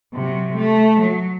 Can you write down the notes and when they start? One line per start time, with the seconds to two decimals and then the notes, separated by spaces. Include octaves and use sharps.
0.14 C3 F#3
0.56 A3
1.01 F#3